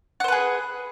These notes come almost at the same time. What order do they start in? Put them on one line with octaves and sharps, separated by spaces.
F#5 C5 B4 G#4